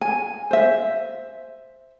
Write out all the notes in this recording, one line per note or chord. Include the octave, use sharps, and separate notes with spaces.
G#5
C5 E5